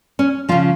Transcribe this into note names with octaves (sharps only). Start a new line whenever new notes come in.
C#4
C#3 F3 F4